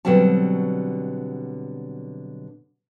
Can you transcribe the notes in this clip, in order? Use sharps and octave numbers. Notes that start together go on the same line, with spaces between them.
B2 D3 F#3 G3 C4 A5